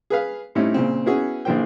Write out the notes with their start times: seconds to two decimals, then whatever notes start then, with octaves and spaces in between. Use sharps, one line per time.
0.10 G#4 B4 F5
0.55 A2 G3 C4 C#4 D#4 E4
0.74 A#2 C#3 C4
1.06 B3 C#4 E4 F#4 G#4
1.45 A#1 D3 E3 A#3 C5 G5